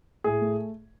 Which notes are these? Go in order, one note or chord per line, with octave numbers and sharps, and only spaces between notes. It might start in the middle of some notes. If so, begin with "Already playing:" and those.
A2 G#4
A3